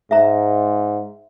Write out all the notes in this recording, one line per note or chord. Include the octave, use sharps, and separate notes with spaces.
G#2 E5 A#5